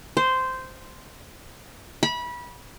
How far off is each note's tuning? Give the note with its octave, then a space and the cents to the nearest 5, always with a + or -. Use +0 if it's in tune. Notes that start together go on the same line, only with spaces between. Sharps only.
C5 -10
B5 -25